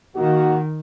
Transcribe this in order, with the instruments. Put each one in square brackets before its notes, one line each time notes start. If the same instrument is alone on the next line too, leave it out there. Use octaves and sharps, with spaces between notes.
[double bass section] D#3 [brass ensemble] A#3 D#4 F#4